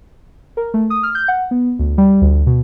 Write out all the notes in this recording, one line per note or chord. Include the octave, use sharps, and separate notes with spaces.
A#4
A3
D#6
F6
G6
F#5
B3
D2
G3
D2
B2